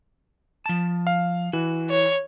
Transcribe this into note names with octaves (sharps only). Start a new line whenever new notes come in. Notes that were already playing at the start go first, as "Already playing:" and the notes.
F3 A5
F5
E3 F#4
C#5